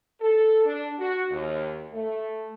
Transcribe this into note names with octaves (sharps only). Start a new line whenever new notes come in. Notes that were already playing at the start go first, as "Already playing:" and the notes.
A4
D4
F#4
D#2
A3